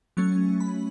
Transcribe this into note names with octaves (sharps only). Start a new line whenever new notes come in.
F#3 A3 C#4 C#6
B5